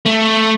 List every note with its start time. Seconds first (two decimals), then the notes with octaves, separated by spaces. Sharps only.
0.06 A3